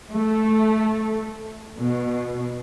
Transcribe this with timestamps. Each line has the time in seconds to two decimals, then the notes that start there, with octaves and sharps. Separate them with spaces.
0.13 A3
1.79 B2